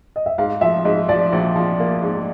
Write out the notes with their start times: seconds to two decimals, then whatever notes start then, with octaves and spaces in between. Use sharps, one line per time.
0.16 D#5
0.26 E5
0.38 G#2 F5
0.61 F3 E5
0.84 G#2 D#5
1.09 F3 D5
1.33 A#1
1.56 F3
1.80 A#3
2.03 G#2